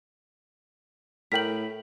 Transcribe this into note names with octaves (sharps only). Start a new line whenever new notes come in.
A2 A#4 G5 B6 F#7